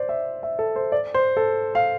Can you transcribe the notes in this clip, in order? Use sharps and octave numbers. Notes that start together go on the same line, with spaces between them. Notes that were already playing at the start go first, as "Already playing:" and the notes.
Already playing: C5 D5
E5
E5
A4
C5
D5
C5
A4
F5